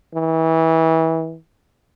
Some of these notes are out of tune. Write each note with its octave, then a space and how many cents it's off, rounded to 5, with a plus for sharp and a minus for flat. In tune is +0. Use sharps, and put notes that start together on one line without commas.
E3 -25